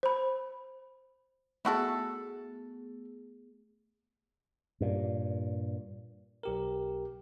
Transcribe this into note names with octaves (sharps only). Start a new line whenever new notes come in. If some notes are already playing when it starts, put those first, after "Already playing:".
C5 B5
A3 B3 E4 F#4 G#4 A4
G2 A#2
B1 G4 A#4